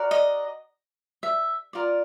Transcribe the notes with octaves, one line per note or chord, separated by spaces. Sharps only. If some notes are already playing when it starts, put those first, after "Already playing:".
Already playing: F#4 A#4 D5
D#5
E5
F4 A#4 D5